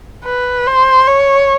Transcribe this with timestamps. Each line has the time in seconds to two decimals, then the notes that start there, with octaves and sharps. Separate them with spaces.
0.25 B4
0.67 C5
1.08 C#5